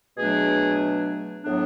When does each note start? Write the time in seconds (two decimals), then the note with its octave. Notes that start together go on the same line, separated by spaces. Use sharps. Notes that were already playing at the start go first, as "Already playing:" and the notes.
0.17 B2 F#3 A3 D4 G#4
1.43 A2 F#3 B3 D4